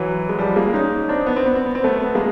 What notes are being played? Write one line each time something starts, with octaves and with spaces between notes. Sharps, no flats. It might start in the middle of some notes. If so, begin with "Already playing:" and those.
Already playing: E3 F#3
G#3
F3 G3
G#3 A#3
C#4 D#4
C4 D4
B3
C4
B3
C4
B3
C4
A3 B3
B3
G#3 A#3